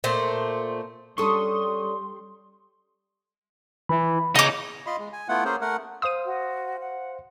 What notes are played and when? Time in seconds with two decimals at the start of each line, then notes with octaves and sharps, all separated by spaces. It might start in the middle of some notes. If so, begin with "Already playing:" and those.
0.04 A#2 A3 C5
1.18 G3 C#4 D4 A4 C6 C#6 D#6
3.89 E3 B5
4.35 C#3 D#4 C#5 D#5 D6
4.86 F4 D#5 B5 C6
4.99 G#3
5.13 G#5
5.29 A3 B3 E4 F4 F#5
5.45 A#3 C#4 G#4 C5
5.61 A3 A#4 F#5
6.02 C5 F5 C6 D#6 D#7
6.25 F#4
6.79 F#5